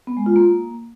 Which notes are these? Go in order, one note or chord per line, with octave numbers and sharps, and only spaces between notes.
B3
G#3
F4
A#3